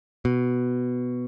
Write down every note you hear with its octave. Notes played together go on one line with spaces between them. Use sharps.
B2